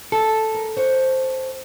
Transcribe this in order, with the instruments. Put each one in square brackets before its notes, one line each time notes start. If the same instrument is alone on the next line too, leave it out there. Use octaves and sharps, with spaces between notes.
[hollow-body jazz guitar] A4
[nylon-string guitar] A#4
C5 C#5